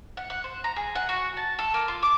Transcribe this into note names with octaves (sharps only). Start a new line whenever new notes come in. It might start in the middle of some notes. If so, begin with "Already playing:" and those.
F#5
F#5
C5
A#5
G#4
F#5
F#4
A5
A4
A#3
F4
D6